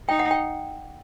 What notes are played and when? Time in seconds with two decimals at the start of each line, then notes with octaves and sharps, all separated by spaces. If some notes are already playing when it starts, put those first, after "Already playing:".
0.09 D#4 G5
0.19 F#5
0.31 G5